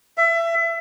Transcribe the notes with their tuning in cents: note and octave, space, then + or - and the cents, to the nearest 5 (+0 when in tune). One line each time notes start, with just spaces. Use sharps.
E5 +25